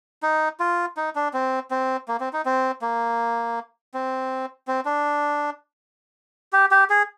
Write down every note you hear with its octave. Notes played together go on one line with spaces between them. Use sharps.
D#4
F4
D#4
D4
C4
C4
A#3
C4
D#4
C4
A#3
C4
C4
D4
G4
G4
G#4